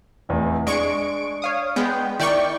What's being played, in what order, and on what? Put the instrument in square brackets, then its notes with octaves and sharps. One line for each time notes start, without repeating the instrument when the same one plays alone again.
[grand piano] F1 E2 A2
[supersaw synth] G#3 C#6 [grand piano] D4 [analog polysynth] D7
[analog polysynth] C#5 F5 D#6
[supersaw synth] G#3 B3 [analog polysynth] G5
[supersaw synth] D#3 G5 C#6 [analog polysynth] E4 D5